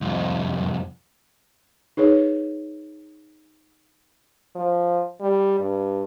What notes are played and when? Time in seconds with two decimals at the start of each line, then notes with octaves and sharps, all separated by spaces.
0.01 C2 F2
1.97 D#4 G#4 B4 C#5
4.55 F3
5.21 G3
5.60 G2